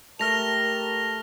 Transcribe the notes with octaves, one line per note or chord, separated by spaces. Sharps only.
A3 G4 A#4 A5 F6 A#6 F7